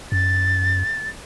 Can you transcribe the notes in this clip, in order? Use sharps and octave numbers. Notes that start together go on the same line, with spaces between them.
F#2 A6